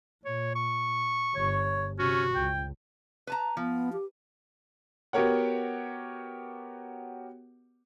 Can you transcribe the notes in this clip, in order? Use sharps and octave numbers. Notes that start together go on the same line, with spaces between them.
A#2 C#5
C#6
G1 C#5
C3 C#4 F#4
C#2 G5
B4 A5 A#5
F3 B3
G4
B3 F#4 G4 A#4 C#5 F#5